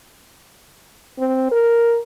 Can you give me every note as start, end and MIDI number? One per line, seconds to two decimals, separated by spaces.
1.19 1.48 60
1.52 2.00 70